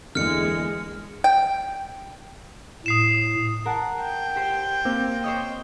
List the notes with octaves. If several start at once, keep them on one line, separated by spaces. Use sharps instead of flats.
E2 D3 G#3 A#3 B3 E4 F6 C#7
G5
A2 D#6 C7 E7
A#4 F#5 A5
G5
G4 C5
A#3 C4
C5 C#5 D#5